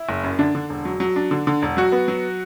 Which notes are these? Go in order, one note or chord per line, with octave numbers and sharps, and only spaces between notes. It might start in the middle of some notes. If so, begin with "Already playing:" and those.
Already playing: E4
F#1
F#2
D3 D4
D3
E1
F#3
F#3
D4
D3
D3
E1
F#3 F#4
B3
F#3